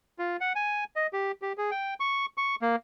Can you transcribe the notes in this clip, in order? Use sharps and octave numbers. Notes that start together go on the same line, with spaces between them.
F4
F#5
G#5
D#5
G4
G4
G#4
G5
C#6
C#6
A#3